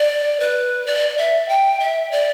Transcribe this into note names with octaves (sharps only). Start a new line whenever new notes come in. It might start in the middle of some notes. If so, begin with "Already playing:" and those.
Already playing: D5
B4
D5
E5
G5
E5
D5